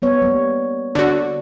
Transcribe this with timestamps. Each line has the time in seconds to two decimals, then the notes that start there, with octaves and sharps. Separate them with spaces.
0.02 G3 B3 C#5
0.22 G3 A#3
0.95 D3 F#4 D5